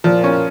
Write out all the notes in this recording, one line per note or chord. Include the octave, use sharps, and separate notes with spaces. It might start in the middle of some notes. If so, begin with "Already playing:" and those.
A#2 F3
C#4